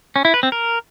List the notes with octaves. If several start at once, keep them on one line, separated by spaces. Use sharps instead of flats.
C#4
E4
B4
C4
A#4